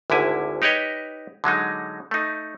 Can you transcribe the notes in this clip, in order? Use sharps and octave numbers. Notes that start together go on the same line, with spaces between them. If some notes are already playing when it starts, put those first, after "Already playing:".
G#1 D2 D3 E4 G#5
D#4 G4 B4 C#5 D#5
D3 F#3 G#3 D#4
A3 D#4